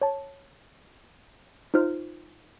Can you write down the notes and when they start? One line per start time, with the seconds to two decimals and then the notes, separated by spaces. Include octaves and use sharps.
0.02 C#5 A5
1.74 D#4 F4 C5 F6